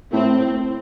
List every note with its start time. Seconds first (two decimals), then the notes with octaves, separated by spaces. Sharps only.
0.12 A2 C4